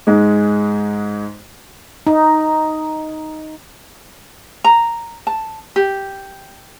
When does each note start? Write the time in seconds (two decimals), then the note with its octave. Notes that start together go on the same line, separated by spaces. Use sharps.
0.07 G#2 G#3
2.07 D#4
4.64 A#5
5.27 A5
5.76 G4